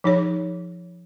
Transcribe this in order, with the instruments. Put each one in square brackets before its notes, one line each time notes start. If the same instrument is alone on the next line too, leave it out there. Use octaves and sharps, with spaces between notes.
[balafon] F3 D#4 G#4 C#5